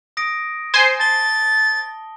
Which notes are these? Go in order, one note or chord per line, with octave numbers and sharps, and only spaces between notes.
D#6 A#6 D7
C5 G#5 C6
A5 A6 G7